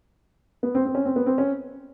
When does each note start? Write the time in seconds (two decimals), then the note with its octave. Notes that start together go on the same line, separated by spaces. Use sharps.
0.63 B3
0.75 C4
0.85 C4
0.95 C#4
1.05 C4
1.16 B3
1.26 C4
1.38 C#4